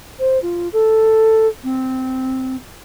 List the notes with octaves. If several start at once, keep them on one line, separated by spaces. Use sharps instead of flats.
C5
F4
A4
C4